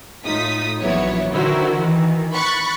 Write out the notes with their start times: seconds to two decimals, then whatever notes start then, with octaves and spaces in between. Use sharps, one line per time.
0.25 A2 D#4 F4 D#6 B6
0.82 A#1 E3 F#3 B3 E4 C#5
1.32 D3 D#3 E4 F#4 A#4 C5
1.79 D#3 E3
2.32 B5 C#6 F#6 A6